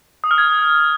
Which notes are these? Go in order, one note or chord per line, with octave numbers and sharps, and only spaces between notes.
D#6
F6
G#6